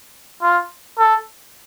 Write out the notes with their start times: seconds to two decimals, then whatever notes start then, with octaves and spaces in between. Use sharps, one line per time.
0.42 F4
0.98 A4